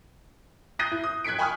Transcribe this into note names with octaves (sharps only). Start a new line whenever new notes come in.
D#6 F#6 G6 A#6 C7 D#7
E4
D#6
F#6 G#6 B6 C#7 D7
G5 G#5 B5 C#6 D#6 F6